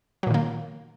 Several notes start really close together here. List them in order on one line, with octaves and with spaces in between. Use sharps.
F#3 A#2 D#3 A#3